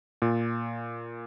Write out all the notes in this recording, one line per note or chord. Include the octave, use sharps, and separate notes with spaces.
A#2